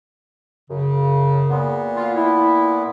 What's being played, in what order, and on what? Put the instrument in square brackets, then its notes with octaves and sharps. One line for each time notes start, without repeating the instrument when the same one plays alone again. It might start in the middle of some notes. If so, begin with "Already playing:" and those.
[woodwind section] F#2 C#3
[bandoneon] A#2 B3
[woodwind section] F4
E4